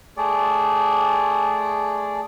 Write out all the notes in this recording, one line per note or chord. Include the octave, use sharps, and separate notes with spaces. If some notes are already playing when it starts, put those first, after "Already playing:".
A3 G#4 D5